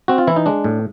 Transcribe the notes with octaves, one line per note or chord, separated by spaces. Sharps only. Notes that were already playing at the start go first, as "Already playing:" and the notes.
C4 F#4
F4
E3 E4
D#4
G#3 D4
A2